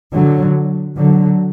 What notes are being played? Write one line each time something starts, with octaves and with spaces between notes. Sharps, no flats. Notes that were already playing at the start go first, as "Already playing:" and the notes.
D3 F#3
D3 F#3